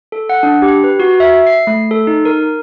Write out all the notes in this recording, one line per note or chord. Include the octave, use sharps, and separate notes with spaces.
A4
F#5
D4
G4
B4
F#4
E5
C7
A3
A4
D#4
A#4